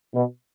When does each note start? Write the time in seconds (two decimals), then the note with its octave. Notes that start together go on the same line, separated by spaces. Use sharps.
0.14 B2